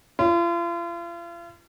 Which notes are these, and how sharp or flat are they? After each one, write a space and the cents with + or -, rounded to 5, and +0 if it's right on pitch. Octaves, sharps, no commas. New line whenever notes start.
F4 -40